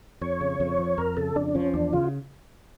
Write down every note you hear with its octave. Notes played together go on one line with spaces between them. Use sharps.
F2 C#5
C#3
F2
F3
F2 A#4
C#3 A4
F2 D4
F3 C#4
E2 D4
C#3 F4